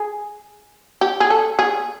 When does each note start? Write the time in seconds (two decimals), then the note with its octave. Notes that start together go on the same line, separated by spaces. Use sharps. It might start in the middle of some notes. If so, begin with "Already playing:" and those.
Already playing: G#4
1.01 G4
1.20 G#4
1.30 A4
1.59 G#4